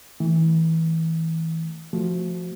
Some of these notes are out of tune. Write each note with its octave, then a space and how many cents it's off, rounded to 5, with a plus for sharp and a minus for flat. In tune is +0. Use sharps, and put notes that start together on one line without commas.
E3 -25 A3 +0
F3 +0 A3 +0 F#4 -5